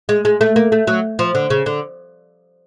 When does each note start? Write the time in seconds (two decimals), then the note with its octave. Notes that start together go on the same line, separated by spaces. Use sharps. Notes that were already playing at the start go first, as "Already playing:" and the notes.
0.09 G#3
0.25 G#3
0.41 A3
0.56 A#3
0.72 A3
0.87 F#3
1.19 F3
1.35 D3
1.50 C#3
1.66 D3